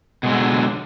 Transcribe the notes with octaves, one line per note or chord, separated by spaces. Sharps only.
B2 D3 F#3 G#3